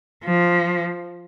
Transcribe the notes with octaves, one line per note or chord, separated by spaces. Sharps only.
F3